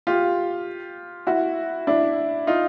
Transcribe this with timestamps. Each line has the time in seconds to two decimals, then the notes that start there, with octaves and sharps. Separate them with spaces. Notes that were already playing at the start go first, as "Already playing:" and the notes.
0.07 F4 G4
1.27 E4 F#4
1.87 D4 E4
2.47 D#4 F4